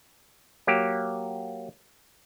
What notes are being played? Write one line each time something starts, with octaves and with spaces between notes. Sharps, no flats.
F#3 A#3 G4